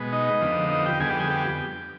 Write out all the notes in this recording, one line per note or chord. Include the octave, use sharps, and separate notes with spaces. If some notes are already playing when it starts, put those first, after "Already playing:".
Already playing: B2 G#3 B3
D#4 D#5
F2 D3 F3 B3
D#4 D#5
G4 G5
F2 D3 G3 B3 G#4 G#5
G4 G5
G#4 G#5
G4 G5